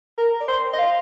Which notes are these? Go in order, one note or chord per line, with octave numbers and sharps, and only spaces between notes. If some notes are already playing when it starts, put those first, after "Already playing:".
A#4
D5
C5
D#5
F5